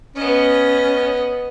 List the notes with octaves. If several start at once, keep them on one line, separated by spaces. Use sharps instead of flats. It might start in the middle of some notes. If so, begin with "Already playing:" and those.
B3 C#4 D#5